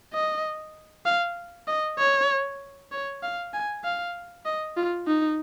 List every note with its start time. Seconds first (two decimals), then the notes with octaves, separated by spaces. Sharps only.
0.14 D#5
1.06 F5
1.68 D#5
1.98 C#5
2.92 C#5
3.23 F5
3.54 G#5
3.84 F5
4.45 D#5
4.77 F4
5.07 D#4